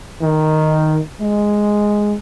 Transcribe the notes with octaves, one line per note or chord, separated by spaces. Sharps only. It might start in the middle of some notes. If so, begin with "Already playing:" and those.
D#3
G#3